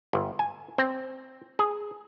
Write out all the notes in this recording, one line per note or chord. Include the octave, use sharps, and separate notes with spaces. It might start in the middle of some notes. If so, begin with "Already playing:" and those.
G1
G#5
C4
G#4